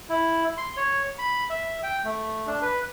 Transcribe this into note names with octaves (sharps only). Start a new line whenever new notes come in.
E4
C6
C#5
B5
E5
G5
A3
D4
B4